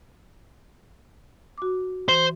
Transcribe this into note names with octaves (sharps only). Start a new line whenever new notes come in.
F#4 D6
E3 C5